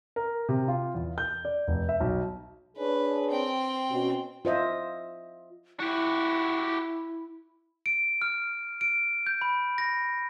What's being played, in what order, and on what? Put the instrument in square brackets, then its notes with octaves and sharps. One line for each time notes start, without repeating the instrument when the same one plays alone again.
[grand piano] A#4
C3
F4
E2
G6
D5
F1
E5
B1
[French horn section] D4 G#4 C#5 [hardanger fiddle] B4
[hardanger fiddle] C4 G5
[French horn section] B2 C#4 F#4
[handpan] F4 C5 D#5 E5
[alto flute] E4 [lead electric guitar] F#4 G4
[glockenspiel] D7
F6
D7
G6
B5
A#6